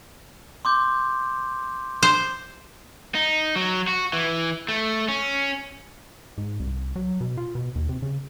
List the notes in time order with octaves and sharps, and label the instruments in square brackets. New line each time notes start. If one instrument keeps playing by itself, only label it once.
[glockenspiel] C6 D6 G6
[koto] C5
[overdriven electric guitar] D#4
F#3
F#4
E3
A3
C#4
[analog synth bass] G#2
C2
F#3
B2
F4
B2
D#2
C3
C#3